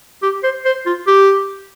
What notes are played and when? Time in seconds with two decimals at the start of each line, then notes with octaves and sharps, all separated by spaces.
0.22 G4
0.43 C5
0.65 C5
0.86 F4
1.07 G4